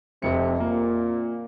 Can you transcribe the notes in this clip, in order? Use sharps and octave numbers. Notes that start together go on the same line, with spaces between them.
F1 F2 C3 C#7
A#2 A#3